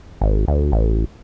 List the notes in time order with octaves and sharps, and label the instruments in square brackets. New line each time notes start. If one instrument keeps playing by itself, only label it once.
[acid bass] G#1
D2
A1